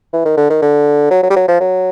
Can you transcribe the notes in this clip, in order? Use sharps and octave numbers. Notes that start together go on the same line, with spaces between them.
E3
D#3
D3
D#3
D3
F#3
F#3
G3
F#3
F3
F#3